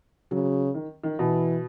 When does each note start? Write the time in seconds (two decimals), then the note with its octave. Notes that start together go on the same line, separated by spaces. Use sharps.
0.31 C#3 F#3
0.74 D#3
1.04 D#3
1.18 B2 E3